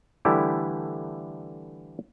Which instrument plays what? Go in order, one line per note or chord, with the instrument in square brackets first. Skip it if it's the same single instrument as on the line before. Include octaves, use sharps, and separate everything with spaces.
[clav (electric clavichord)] D3 E3 G3 A3 E4 G4